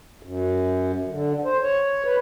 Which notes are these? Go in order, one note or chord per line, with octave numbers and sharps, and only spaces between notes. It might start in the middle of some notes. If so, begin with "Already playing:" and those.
F#2
D3
C5
C#5
B4